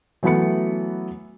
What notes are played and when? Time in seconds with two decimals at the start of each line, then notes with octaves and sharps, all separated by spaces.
0.23 E3 F#3 A3 B3 B5 C#7